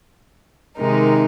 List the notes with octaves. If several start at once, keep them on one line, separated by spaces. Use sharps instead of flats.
C3 D#3 G#3 D#4 A#4